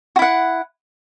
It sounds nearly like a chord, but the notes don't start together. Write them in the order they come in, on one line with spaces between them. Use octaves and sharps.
F#4 E4 F#5